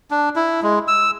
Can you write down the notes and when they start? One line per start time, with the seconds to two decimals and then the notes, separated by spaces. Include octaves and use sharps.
0.11 D4
0.36 E4
0.63 G#3
0.88 E6